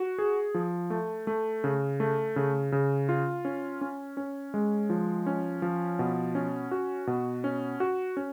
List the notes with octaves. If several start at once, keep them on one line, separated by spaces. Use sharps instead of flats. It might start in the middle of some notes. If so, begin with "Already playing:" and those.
Already playing: F#4
G#4
F3
A3
A3
C#3
A3
C#3
C#3
F4
C#4
C#4
C#4
G#3
F3
C#4
F3
B2
C#4
F#4
B2
C#4
F#4
C#4